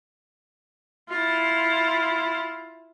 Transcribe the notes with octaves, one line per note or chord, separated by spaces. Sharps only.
E4 F4